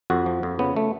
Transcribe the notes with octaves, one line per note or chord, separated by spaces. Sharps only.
F2 F#4
F3
F2
C#3 B3
A3